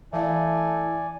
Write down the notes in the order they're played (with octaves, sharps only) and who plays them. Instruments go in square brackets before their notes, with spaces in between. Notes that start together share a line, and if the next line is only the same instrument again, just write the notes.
[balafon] E3 E5 F5 [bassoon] A3 [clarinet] E4 [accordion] D5 G#5